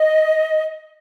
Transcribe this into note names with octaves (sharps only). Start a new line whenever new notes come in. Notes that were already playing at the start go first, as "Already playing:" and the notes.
Already playing: D#5